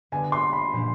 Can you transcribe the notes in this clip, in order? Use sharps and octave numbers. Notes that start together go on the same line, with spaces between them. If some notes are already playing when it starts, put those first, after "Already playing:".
D3 G3 B3 D4 G#5
C6
B5
A#2 F3 A#3 D4